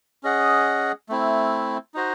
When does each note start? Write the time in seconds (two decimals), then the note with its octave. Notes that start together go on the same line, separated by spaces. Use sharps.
0.23 C#4 G#4 D#5 F#5
1.09 A3 C4 E4
1.94 D#4 F#4 C5 D#5